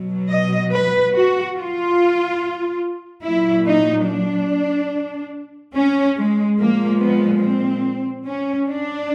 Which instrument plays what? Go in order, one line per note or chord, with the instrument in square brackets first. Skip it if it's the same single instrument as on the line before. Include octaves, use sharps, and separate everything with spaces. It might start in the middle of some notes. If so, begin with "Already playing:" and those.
Already playing: [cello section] B2 F#3
D#5
B4
F#4
F4
A#2 F#3 E4
D#4
D4
C#4
G#3
A#2 F3 G#3 A#3
B3
C4
C#4
D4